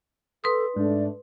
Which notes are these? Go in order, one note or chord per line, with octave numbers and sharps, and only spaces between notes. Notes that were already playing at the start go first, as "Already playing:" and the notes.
A4 B4 C6 D#6
G#2 A3 D4 D5